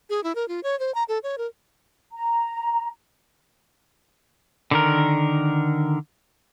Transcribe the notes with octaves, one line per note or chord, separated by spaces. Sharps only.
G#4
E4
A#4
F4
C#5
C5
A#5
A4
C#5
A#4
A#5
D3 D#3 A#4